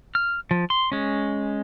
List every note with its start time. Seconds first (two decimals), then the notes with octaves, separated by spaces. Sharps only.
0.15 F6
0.51 F3
0.70 C6
0.92 G#3 C#4